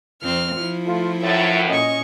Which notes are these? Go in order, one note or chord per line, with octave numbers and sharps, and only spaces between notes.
F2 C4 F6
F3 E4
A3 F4
F#2 A2 E5 A6
A#2 C#4 D#5 C#6